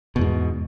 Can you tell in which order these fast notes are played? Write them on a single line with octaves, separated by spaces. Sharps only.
B2 E2 G#2